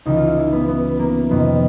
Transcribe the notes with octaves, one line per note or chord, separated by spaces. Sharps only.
C#2 C#3 E3 D#4
F4
E4
E4
B3
B3
A#3
F2 C3 D#3 B3